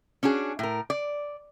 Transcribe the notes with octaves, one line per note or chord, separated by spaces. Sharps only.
C#4 D4 F#4 G#4
A2 A#4
D5